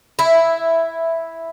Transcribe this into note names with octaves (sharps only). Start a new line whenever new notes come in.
E4